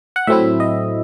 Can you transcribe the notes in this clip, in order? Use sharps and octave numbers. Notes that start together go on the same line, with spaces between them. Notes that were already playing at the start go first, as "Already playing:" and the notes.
F#5
A2 F#3 A3 C4 E4 E5
D#5